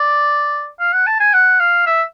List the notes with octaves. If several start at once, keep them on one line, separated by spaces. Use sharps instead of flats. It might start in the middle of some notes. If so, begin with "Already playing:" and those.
Already playing: D5
F5
F#5
A5
G#5
F#5
F5
E5